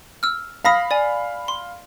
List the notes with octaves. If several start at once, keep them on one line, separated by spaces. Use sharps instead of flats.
E6 F6
F5 B5 D#6 A#6 B6
D5 G#5
C6